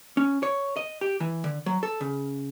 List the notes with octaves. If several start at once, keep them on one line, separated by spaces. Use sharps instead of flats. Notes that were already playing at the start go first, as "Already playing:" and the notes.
C#4
C#5
D#5
G4
E3
D3
F#3
A4
C#3